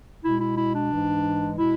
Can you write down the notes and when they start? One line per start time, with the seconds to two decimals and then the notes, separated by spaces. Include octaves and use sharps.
0.24 B2 G#3 E4
0.40 E4
0.57 E4
0.74 D4
0.91 G#2 E3 G#3
1.58 B2 G#3 E4